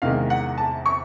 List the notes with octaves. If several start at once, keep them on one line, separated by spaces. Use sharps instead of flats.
E2 C3 D#3 G#3 F5
F#5
A5
C#6